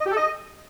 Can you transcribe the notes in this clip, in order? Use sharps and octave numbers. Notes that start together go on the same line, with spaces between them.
D#5
G4
A4
D#5